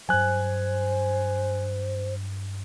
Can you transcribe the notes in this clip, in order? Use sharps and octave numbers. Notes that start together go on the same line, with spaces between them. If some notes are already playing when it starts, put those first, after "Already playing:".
G2 F#3 C5 G#5 F#6